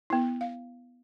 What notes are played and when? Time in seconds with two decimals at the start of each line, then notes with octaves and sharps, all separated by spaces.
0.10 B3 E4
0.41 F5